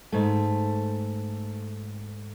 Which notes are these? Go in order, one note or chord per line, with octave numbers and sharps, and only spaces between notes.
G#2 A3